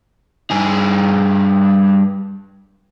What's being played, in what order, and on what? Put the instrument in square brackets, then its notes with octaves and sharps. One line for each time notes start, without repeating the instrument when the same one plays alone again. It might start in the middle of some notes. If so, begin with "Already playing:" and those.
[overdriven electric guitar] G2 G#4